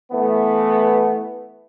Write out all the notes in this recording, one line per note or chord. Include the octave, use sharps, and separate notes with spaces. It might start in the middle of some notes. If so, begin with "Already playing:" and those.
E3 A3 B3